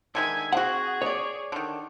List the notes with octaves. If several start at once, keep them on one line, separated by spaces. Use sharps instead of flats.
D3 D#3 G#3 E5 G#5
C4 F#4 G#4 F#5
C#5 D5
D3 D#3